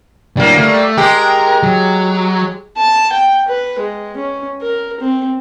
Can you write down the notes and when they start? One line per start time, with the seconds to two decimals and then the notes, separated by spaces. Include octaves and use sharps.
0.37 D3 F#3 G3 A#3
0.58 A3
0.97 G#3 G4 A#4
1.63 F#3
2.77 A5
3.13 G5
3.48 B4
3.79 G#3
4.16 C#4
4.62 A#4
5.00 C4